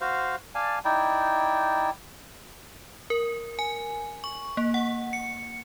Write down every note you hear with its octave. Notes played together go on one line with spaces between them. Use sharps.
F#4 C5 F5
D5 F5 G#5 A5
D#4 E4 D5 G5
A#4
G#5
C#6
A#3
F#5
C#7